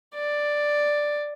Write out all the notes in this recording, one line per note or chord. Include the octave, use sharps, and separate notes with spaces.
D5